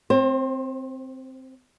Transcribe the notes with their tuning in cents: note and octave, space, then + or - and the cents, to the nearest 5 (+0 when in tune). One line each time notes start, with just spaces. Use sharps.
C4 -5 C5 +35